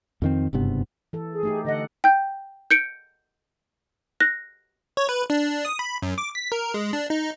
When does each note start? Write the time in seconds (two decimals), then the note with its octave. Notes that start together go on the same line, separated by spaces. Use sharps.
0.22 F2 D#3 C4
0.53 F#1 G2 C3 B3
1.13 E3 A4
1.31 G#4
1.43 A3 D#4 G4
1.65 D3 A4 D#5 F#5
2.04 G5 G6
2.71 G6 C#7 D7
4.20 F#6 A#6
4.97 C#5
5.09 B4
5.30 D4
5.65 D#6
5.79 B5
6.02 F#2
6.18 D6
6.35 B6
6.52 A#4
6.74 G#3
6.93 D4
7.10 D#4